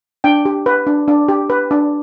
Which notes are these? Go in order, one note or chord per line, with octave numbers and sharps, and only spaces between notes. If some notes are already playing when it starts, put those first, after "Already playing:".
D4 G5
G4
B4
D4
D4
G4
B4
D4